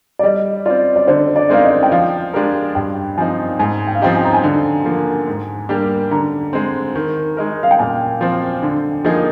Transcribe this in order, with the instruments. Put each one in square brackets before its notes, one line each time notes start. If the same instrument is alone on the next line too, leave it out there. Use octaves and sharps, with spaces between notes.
[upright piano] D5
[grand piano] G3 [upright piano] D#5
[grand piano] C4 F4 [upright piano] D5
[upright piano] D5
[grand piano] D3 [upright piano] C5
[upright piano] D5
[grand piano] G#3 C4 D#4 A#4 [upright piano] F5
[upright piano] D#5
G5
[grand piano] F3 [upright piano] F5
[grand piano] G#3 D4 G4 A#4
[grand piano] G2 [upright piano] G5
[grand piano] F3 C4 D#4 [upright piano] G#5
[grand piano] G#2 [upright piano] G#5
[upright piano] G5
F5
[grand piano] F3 C4 D#4 G4 [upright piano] G5
[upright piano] G#5
A#5
G#5
[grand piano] D3
F3 A#3
G#2
G3 A#3 D4 G4
[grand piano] D3 [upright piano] A#5
[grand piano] G#3 C4
D#3
G#3 D#4 A#4
[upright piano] F5
G5
[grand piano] A#2 [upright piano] G#5
[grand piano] F3 C4
D3
F3 A#3 D#4 G#4